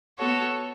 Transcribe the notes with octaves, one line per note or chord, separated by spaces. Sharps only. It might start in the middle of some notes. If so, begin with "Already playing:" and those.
B3 F#4 A4 C#5